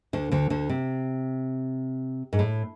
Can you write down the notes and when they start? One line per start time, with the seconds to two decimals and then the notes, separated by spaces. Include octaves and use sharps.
0.13 D2 D3
0.31 D2 D3
0.50 D2 D3
0.69 C3
2.33 G#2
2.39 A2